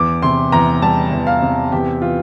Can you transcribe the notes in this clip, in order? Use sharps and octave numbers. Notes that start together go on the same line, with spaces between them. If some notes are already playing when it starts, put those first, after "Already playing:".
Already playing: E2 D6
C3 C6
E2 A#5
G3 A5
E2
F5
C3
E2 G4
E3 F4